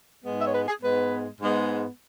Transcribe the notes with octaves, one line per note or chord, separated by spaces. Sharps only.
G#2 G#3 B3
E5
C#5
B4
G#4
G#2 G#3 B3 B4
G#2 G#3 B3